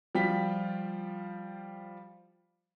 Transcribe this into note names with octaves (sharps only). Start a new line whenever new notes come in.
F3 G3 F4 F5 G5 B6